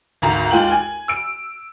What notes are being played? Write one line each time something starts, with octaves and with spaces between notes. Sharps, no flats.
G#1 D2 A#5 F7
D#2 G#3 F4 G5 F#7
G#5
E6 D7